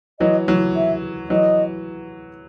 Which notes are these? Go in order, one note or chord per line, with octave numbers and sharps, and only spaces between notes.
E3 F#3 D#5
E3 F#3
E5
E3 F#3 D#5